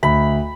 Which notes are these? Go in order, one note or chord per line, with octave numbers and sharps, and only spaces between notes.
D2 B5